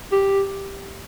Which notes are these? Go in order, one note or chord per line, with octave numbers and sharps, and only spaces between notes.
G4